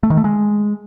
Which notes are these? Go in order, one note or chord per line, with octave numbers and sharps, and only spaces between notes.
A3
D#3
A3
G#3